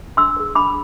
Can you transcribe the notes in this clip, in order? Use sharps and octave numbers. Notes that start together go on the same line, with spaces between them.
D4 C6 E6
G#4 B4
D4 B5 D6